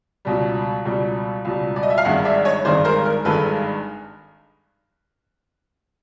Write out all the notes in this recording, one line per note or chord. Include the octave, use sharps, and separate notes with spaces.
C#2 B2 G3
C#2 B2 G3
C#2 B2 G3
D5
D#5
E5
F5
G#1 G2 D#3 G#3 E5 F#5
D5 E5
C#5 D#5
G#1 G2 D#3 G#3 C5 D5
A#4 C5
A#4
G#1 G2 D#3 G#3 A4 B4